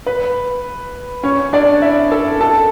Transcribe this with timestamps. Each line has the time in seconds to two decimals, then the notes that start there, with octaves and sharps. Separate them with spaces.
0.07 B4 B5
1.23 C#4 C#5
1.53 D4 D5
1.82 E4 E5
2.12 A4 A5
2.41 A4 A5